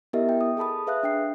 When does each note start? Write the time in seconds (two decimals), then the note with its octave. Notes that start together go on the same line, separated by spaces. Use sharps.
0.13 B3 E4 G4 A#4 D#5 E5
0.29 G5
0.41 D#6
0.57 G#4 A4 A5 B5 D#6
0.87 G#4 B4 E5 F5 D#6 F#6
1.03 D4 G5 C7